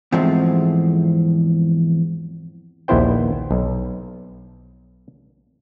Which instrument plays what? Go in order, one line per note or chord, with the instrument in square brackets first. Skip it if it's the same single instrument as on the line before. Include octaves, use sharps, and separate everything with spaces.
[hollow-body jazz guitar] E2 G#2 F3 A3 C4
[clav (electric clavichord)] A#1 D#2 B3 E4 C5 G5
B1